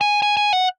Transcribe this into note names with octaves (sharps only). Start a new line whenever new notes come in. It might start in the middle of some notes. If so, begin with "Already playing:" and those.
G#5
G#5
G#5
F#5